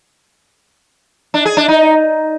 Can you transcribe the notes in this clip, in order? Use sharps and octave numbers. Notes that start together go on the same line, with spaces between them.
D4
G#4
D4
D#4